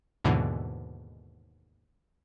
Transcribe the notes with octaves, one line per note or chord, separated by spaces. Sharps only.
D#2 G#2 B2 D3 E3